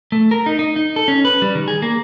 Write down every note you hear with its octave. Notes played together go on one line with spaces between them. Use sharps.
A3
A#4
D#4
D#4
D#4
A4
C#4
B4
G3
D#3
G#4
A#3